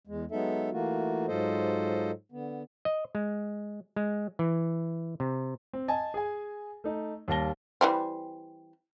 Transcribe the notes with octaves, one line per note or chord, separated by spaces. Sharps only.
E2 G#3
F#3 G#3 B3 D#4 A4 E5
E3 A3 A#3 F4 F#4
G#2 F#3 F4 A4 C5 D#5
D3 B3
D#5
G#3
G#3
E3
C3
C4
D#5 G#5 A5
G#4 G#5
A3 D#4
D#2 G3 F5 A5 A#6 G7
E3 G3 C4